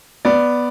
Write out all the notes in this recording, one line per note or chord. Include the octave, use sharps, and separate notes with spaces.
B3 D5